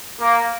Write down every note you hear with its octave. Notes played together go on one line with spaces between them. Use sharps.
A#3